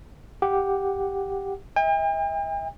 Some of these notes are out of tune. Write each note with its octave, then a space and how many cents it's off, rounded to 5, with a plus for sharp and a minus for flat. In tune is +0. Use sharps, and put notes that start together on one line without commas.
G4 +0 F#5 +0
E5 -40 G5 +45